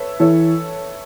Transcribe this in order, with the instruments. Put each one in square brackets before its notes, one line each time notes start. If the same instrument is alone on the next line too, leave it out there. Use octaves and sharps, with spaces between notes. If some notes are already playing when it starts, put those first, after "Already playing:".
Already playing: [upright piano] A4 B4 C#5 E5
[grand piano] E3 [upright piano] A4 C#5